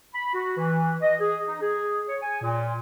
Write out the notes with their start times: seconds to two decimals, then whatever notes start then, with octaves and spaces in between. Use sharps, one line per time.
0.14 B5
0.34 F#4
0.57 E3
1.02 D#5
1.20 G#4
1.47 D#4
1.62 G#4
2.09 C#5
2.22 G#5
2.43 A#2